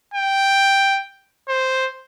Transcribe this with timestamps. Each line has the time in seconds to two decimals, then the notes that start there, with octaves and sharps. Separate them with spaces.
0.14 G5
1.48 C5